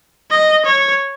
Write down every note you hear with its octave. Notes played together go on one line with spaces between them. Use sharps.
D#5
C#5